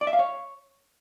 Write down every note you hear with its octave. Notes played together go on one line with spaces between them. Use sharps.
D5
E5
F5
C#5